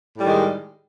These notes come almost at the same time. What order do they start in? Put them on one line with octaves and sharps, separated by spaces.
A2 G3 D#3 G#3